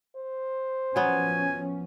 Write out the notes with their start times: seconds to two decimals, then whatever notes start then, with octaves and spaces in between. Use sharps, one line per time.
0.16 C5
0.96 F3 F#3 B3 C#4 G#5